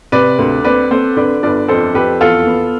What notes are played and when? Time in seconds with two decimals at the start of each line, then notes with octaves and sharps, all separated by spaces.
0.12 C3 B4 D5
0.38 D2
0.64 C4 B4 D5
0.91 C4 A4 C5
1.17 D3 B4 D5
1.43 G1 B4 D5
1.68 F2 A4 C5
1.95 F2 G4 B4
2.21 E2 F4 A4
2.47 B3